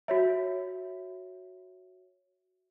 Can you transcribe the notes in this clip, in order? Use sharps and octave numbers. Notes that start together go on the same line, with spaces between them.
F#4 C#5 E5